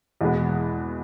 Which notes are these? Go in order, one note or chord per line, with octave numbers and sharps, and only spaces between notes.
E2 B2 G#3 B3